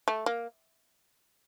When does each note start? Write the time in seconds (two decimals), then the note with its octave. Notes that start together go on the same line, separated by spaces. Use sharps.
0.08 A3
0.26 A#3